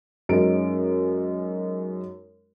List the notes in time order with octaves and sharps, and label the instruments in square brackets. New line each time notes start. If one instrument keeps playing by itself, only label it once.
[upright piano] F#2 G#3 C#4 D#4 F#4 D7